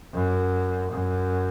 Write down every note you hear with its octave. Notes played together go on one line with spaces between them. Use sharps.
F#2
F#2